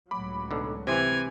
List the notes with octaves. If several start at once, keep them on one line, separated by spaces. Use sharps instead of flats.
C#2 A2 F#3 B5 D6
B1 D3
C3 E3 C4 E4 G#5 C6